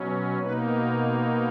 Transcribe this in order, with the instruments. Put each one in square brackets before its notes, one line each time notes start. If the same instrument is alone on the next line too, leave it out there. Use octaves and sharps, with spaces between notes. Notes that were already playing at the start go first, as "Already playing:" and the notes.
Already playing: [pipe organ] B2 F#3 C#4
B2 A#3 D#4 B4